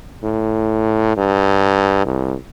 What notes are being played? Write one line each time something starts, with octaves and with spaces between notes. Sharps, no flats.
A2
G2
C2